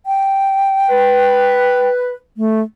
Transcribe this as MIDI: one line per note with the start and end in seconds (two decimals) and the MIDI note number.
0.06 1.89 79
0.89 2.15 71
2.37 2.61 57